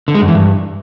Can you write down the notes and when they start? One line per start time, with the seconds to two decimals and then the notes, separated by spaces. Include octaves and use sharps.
0.08 D3
0.15 G#3
0.21 F#2
0.28 E3
0.35 G2